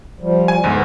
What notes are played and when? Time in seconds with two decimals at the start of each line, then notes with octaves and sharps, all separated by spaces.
0.20 F3 G3
0.48 G#5
0.64 D2 G#2 B3